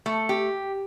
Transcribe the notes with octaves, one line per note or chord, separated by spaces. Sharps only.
A3
G4